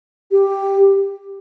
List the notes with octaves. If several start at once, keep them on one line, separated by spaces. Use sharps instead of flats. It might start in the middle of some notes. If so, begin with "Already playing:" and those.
G4